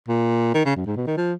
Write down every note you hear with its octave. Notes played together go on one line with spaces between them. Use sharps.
A#2
D#3
C#3
F#2
G#2
B2
D#3
F3